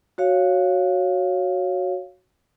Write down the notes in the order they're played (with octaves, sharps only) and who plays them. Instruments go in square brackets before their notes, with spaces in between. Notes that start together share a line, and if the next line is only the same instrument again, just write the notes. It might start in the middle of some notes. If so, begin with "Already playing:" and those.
[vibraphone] F#4 C#5 F5